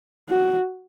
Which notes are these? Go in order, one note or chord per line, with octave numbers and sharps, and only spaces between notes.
F#4